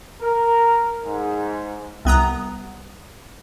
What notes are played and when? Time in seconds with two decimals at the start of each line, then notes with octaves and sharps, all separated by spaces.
0.21 A#4
1.05 G#2
2.05 C2 B3 A#5 D#6